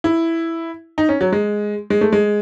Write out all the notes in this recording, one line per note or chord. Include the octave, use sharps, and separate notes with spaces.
E4
D#4
C#4
F#3
G#3
G#3
A3
G#3